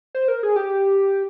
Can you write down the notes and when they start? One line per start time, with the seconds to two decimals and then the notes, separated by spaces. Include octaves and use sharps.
0.15 C5
0.28 A#4
0.43 G#4
0.56 G4